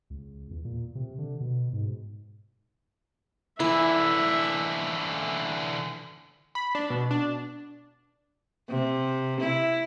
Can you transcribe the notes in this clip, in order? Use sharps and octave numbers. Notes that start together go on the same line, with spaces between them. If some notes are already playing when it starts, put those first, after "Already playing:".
C#2
E2
A#2
C3
D3
B2
G#2
D3 E3 E4 E5
B5
D4
B2
D4
C3
E4